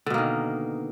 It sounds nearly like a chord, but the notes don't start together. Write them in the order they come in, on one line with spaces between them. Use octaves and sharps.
D3 B2 A#3 D#3